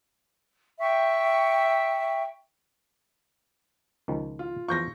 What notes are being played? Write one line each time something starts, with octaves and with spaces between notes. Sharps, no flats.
E5 G5 C#6
C#2 D#3 F3
F4
E2 F3 F4 C#6 G6 A#6